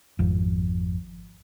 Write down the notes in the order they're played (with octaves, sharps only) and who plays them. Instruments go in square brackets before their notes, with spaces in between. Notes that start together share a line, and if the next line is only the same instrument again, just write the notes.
[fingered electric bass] G#1 F2